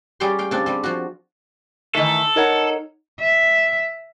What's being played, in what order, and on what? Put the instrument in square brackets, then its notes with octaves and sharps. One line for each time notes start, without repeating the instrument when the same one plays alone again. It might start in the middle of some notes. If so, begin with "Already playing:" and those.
[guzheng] G3 C#4 G4 G#4 G5 C6
F5 G5
C#3 C4 D4
G3 C4
F3 F#4
[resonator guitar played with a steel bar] D#3 E3 A3 [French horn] D#4 [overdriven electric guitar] A4
[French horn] D#4 [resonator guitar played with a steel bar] A#4 C#5 F#5
[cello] E5